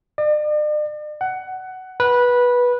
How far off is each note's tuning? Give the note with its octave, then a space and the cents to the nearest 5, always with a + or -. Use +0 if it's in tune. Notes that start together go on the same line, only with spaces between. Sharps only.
D5 +45
F#5 +15
B4 -15